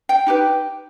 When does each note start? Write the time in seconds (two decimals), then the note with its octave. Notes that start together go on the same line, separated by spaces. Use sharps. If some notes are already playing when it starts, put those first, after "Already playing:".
0.09 G5
0.27 D#4 G4 B4